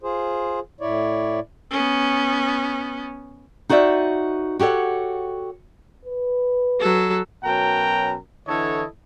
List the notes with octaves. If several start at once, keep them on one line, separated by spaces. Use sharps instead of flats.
F4 G#4 C5
A2 E4 C#5 D5
B3 C#4
D#4 F#4 C5 D5 E5
F#4 G4 A4 C#5 F#5
B4
F#3 A4
B2 F#3 C#4 A#4 G5 A#5
D3 E3 E4 A4 C#5 D#5